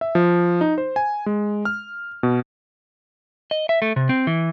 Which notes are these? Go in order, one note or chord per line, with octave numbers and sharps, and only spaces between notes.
E5
F3
D#4
C5
G#5
G#3
F6
B2
D#5
E5
A3
C3
C4
E3